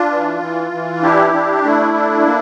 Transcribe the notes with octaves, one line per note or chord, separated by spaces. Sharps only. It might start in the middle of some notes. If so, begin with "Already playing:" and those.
Already playing: D4 F4
E3
E3
E3
D4 E4 G4
D4
A3 E4
D4
A#3